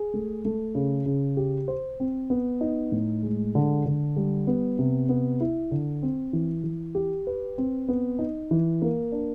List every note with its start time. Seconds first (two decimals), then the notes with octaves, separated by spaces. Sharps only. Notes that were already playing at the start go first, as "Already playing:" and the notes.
Already playing: G#4
0.14 A3
0.45 A3
0.75 C#3
1.06 C#3
1.37 G4
1.68 C5
2.00 C4
2.30 B3
2.61 D#4
2.92 A2
3.23 G#3
3.55 D3
3.85 D3
4.16 G3
4.47 B3
4.79 C3
5.09 B3
5.40 E4
5.71 D3
6.03 C4
6.33 E3
6.64 E3
6.95 G4
7.27 B4
7.58 C4
7.88 B3
8.19 D#4
8.51 E3
8.82 A#3
9.12 D4